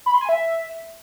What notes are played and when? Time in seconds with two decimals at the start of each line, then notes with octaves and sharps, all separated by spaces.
0.06 B5
0.14 C6
0.21 G#5
0.29 E5